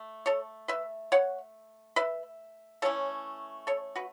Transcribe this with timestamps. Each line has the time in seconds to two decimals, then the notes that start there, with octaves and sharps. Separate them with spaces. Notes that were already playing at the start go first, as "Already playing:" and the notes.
Already playing: A3
0.26 A4 C#5
0.68 B4 E5
1.12 C#5 F#5
1.96 B4 E5
2.82 E3 A3 C#4 E4 A4 C#5
3.67 A4 C#5
3.96 F#4 B4